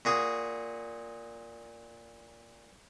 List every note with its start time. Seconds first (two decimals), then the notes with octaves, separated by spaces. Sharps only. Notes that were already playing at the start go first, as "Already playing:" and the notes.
0.05 A#2 F#4 G#4